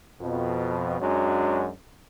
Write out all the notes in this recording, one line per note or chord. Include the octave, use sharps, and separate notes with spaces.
F2 B2
F#2 F#3 G#3 D4